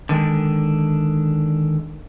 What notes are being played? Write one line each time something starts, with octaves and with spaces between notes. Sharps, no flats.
D3 D#3 G#3 D4